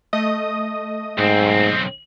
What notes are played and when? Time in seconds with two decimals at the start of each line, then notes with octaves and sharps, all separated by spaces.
0.13 A3 D#5 D#6
1.18 B1 G#2 C4